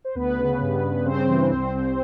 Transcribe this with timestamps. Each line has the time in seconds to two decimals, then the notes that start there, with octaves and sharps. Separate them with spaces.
0.05 C5
0.15 D2 B3 B4
0.37 C#3
0.61 G2
0.83 G2
1.05 C#3 C4 C5
1.28 E3
1.51 C2
1.74 C2